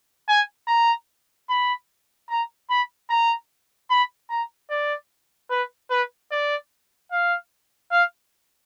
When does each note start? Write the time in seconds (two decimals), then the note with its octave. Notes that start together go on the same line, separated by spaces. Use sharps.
0.28 G#5
0.67 A#5
1.49 B5
2.29 A#5
2.70 B5
3.10 A#5
3.90 B5
4.30 A#5
4.70 D5
5.50 B4
5.90 B4
6.31 D5
7.12 F5
7.91 F5